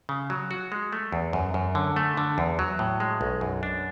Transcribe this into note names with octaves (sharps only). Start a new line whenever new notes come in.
C#3
F#3
F#4
G#3
A3
E2
F#2
F#2
D3
A3
D3
E2
F#3
A2
G#3
B1
F#2
D4